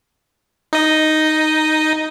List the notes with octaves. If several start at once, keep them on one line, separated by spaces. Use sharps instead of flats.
D#4 D#5